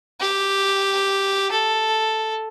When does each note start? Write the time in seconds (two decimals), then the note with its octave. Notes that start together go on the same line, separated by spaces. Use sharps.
0.20 G4
1.51 A4